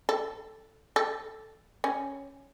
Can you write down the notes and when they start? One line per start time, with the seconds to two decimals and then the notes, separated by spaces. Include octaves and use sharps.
0.09 A4
0.96 A4
1.84 C#4